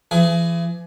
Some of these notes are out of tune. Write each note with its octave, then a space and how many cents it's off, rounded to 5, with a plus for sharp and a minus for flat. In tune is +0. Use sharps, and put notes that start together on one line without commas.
E3 +40 G#4 +15